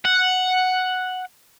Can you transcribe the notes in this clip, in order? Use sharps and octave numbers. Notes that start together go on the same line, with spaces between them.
F#5